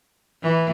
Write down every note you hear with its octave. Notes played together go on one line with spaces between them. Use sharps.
E3